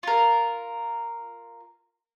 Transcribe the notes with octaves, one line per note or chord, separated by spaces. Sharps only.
F4 A#4